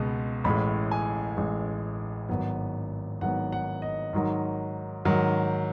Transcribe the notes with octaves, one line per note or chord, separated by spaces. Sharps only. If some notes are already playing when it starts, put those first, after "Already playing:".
Already playing: C#2 B2 G#3 B3
A1 A2 G#3 B5
G#5
A1 A2 G#3
G#1 G#2 F#3 B3
G#1 G#2 F#3 B3 F#5
F#5
D#5
G#2 D#3 F#3
G#2 D#3 F#3